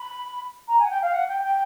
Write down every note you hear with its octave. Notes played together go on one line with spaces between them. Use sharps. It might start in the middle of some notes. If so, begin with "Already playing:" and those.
Already playing: B5
A#5
G#5
F#5
G5
F5
F#5
G5
G5